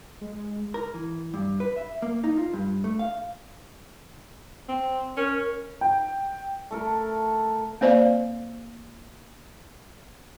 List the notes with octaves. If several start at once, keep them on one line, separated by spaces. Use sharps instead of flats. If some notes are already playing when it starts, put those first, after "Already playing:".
G#3
A#4
E3
G2
B4
E5
A#3
D#4
F4
G2
A3
F5
C4
C#4 A#4
G5
A3 A4 A#4
A#3 C4 C5 D5 F5